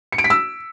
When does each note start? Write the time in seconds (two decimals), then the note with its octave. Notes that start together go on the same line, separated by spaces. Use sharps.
0.12 C#7
0.18 D7
0.24 B6
0.30 E6